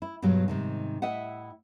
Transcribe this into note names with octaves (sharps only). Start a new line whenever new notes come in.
E4
G2 B2 F#3 F4
G#2 C3 D#3
A2 E4 D#5 E5 F#5